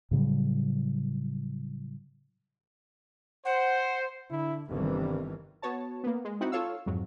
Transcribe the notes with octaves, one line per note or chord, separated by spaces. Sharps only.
A2 C#3 F#3 G3
C5 F#5
D3 E4
G1 G2 C3 D#3 E3
B3 F#4 C#5 A5
A#3 B3
G#3
C4 D#4 E4 F#4 F#5
F4 A4 C#5 F5 E6
F2 G#2 F#3